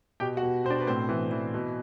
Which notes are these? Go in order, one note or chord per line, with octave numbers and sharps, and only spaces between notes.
B2 G4 G5
F#4 F#5
B2
B2 C5
D4 D5
B4
A2 C4 C5
E3
E3
B2